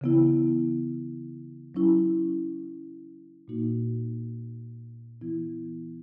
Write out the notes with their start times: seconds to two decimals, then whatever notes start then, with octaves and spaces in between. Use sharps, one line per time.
0.01 C#3 E3 B3 E4
1.75 F#3 C#4 E4
3.48 A#2 A#3 D#4 F#4
5.21 E3 B3 E4